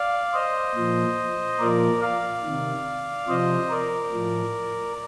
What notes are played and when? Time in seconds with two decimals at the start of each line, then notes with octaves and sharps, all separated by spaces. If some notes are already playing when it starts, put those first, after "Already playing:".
Already playing: D5 F5
0.33 C5 D#5
0.75 A#2 F3
1.59 A#2 F3 A#4 D5
2.02 D5 F5
2.44 C3 D#3
3.28 C3 F3 C5 D#5
3.70 A#4 D5
4.12 A2 F3